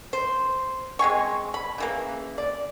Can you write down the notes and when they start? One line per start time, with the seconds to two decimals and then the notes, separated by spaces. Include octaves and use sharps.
0.13 C5
0.99 G#3 C4 G#5 C#6
1.54 B5
1.78 C#3 E3 A#3
2.38 D5